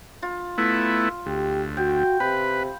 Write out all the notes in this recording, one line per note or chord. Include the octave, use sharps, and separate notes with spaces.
F4
A3 B3 E4
D2 G4
F#4 G5
C3 B4 B5